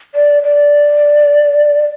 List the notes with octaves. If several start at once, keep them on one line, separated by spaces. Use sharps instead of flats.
D5
D5